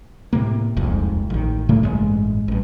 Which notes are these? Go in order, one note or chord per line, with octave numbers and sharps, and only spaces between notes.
A2 C3 A#3
D#1 C2 F2 G#2
A1 D#3
A2 C#3 A3 A#3
A1 G2 C#3 G#3
A1 G2